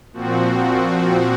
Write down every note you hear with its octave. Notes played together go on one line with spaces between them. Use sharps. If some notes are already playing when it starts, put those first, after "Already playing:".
A#2 F3 C4 F#4